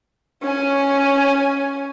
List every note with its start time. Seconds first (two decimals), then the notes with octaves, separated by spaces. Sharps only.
0.43 C#4 G#5